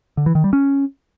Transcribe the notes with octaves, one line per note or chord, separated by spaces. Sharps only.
D3
E3
D#3
G3
C#4